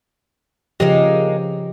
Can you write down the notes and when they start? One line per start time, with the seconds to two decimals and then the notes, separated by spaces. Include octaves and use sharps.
0.80 C#3 F3 G#3 A#3 D#4 G4